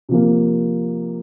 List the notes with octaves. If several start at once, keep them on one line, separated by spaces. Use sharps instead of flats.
C3 F3 A#3